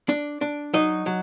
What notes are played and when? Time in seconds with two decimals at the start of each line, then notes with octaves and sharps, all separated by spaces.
0.09 D4
0.41 D4
0.73 F#3 D#4 D#5
1.06 F#3